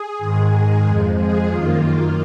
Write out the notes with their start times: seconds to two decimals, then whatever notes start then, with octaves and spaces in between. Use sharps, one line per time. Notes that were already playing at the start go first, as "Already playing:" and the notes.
Already playing: G#4
0.19 G#2 D#3 G#3
0.84 F2 F3 G#3
1.17 G#4
1.50 F#2 D#3 A#3 F4